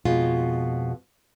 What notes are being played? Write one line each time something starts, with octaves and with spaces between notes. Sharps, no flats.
F2 B2 G#3 F4